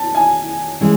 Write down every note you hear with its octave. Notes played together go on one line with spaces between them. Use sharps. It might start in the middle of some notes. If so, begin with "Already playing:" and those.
Already playing: A5
G#5
E3 G#3 C#4